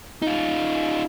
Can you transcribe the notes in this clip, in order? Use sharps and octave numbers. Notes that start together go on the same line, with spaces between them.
D#4 F4